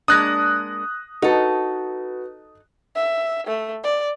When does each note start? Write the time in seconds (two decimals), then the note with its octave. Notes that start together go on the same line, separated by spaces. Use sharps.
0.08 G#3 A#3 D4 D#6 F#6 A#6
1.22 D#4 F#4 A4 B4
2.95 E5
3.47 A3
3.84 D5